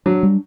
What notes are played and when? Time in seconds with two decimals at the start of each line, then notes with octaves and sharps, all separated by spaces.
0.06 F#3 D4
0.23 G3